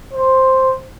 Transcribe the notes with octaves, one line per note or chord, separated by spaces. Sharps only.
C5